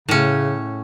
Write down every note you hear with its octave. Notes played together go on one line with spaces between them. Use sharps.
A2 C#3 C#4